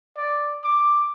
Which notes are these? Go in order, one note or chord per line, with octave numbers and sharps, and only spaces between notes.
D5
D6